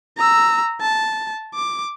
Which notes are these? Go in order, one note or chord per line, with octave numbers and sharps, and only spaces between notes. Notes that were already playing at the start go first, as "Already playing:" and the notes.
A#5 E6
A5
D6